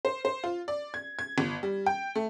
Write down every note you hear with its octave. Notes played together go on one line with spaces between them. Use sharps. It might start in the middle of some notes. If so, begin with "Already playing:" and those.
C5
C5
F4
D5
G#6
G#6
G1
G3
G5
A3